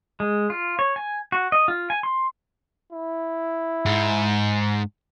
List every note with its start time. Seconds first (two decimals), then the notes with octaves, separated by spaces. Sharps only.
0.20 G#3
0.50 F4
0.79 C#5
0.96 G#5
1.32 F#4
1.52 D#5
1.68 F4
1.90 G#5
2.03 C6
2.92 E4
3.86 G#2